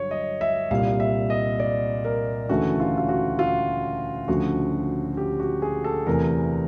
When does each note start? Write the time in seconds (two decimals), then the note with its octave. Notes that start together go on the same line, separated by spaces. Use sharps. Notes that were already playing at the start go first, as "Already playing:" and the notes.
Already playing: G2 D3 F#3 C#5
0.11 D#5
0.41 E5
0.70 C2 A#2 G3 F5
1.00 E5
1.30 D#5
1.60 D5
2.05 A#4
2.49 D2 C#3 E3 A3 F#4
2.80 F4
2.97 F4
3.09 F#4
3.39 F4
4.28 D2 C#3 F3 F#4
5.17 G4
5.40 F#4
5.62 G#4
5.84 A4
6.07 E2 C3 E3 A3 A#4